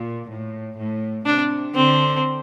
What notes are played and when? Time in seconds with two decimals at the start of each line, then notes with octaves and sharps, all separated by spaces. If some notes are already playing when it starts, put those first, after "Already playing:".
Already playing: A#2
0.31 A2
0.79 A2
1.26 C3 D4
1.75 D3 C4